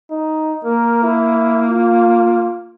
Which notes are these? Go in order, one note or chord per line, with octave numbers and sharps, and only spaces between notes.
D#4
A#3 A#4
E4
F4